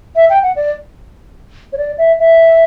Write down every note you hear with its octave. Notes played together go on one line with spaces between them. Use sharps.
E5
G5
F#5
D5
C#5
D5
E5
E5